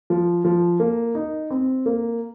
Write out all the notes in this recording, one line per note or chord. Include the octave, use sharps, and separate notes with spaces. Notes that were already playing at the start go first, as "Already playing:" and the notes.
F3
F3
A#3
D#4
C4
A#3